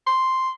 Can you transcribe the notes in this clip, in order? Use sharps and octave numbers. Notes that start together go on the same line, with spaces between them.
C6